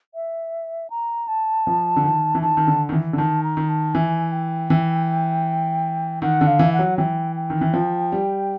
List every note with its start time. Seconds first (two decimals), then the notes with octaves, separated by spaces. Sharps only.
0.15 E5
0.90 A#5
1.28 A5
1.67 F3
1.96 D3
2.04 D#3
2.35 E3
2.42 D#3 A5
2.57 D#3
2.67 D3
2.89 D#3
2.92 E3
3.13 D3
3.18 D#3 A5
3.43 A#5
3.57 D#3
3.69 A5
3.94 E3 G#5
4.32 G5
4.70 E3
6.22 D#3 F#5
6.41 D3
6.47 F5
6.59 E3
6.73 F#5
6.79 F#3
6.98 E3 G5
7.36 G5
7.50 D#3
7.61 E3
7.74 F3
8.12 G3